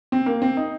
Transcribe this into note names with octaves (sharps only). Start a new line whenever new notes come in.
C4
A#3
C4
D#4